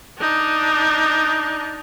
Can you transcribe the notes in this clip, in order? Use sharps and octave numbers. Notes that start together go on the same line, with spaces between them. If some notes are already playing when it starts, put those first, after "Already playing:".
D4 D#4